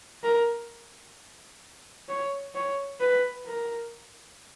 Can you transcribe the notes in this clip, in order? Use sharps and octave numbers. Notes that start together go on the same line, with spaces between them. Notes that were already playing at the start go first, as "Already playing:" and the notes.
A#4
C#5
C#5
B4
A#4